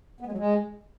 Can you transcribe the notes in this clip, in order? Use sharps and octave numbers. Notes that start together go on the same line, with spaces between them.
B3
G#3
F#3
G#3